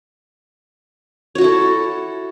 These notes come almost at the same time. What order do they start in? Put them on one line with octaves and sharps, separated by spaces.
C#5 F#4 E4 A4